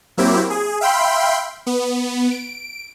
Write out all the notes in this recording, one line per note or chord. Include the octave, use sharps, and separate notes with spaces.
F#3 A#3 C4 E4 G4
G#4
E5 F5 G5 B5 C6
B3
D7